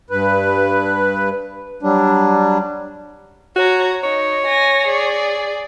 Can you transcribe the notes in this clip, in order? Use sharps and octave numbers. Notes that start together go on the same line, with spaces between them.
G2 B4
F#3 G3 D4
F#4 C#5 A#5
D#4 C#5
G#5 A#6
G#4 D5